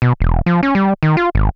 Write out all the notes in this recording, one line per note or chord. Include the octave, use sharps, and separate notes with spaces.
B2
E1
F3
C#4
G3
D#3
F4
G#1